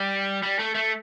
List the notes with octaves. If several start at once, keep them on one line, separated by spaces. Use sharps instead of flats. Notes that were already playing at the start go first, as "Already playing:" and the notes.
Already playing: G3
G3
A3
A3